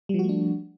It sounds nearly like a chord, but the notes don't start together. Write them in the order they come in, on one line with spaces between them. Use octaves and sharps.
G3 F3 F#4 A3 D4